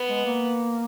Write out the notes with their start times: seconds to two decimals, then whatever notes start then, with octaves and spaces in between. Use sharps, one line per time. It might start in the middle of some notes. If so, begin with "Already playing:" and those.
Already playing: B3
0.09 G#3
0.26 A#3